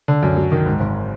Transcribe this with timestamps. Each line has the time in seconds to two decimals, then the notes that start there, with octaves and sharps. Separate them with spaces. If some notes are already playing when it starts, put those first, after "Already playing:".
0.08 D3
0.23 F#2
0.36 F#3
0.52 D#3
0.66 G#2
0.80 G#1